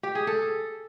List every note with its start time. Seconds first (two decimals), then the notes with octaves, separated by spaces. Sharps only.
0.03 G4
0.15 G#4
0.27 A4